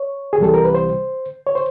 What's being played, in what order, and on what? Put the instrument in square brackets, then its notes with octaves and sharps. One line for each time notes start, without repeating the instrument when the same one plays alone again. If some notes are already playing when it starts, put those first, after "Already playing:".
Already playing: [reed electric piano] C#5
G#4
C2 C3 E3 G3 A4
A#4
B4
C5
C#5
C5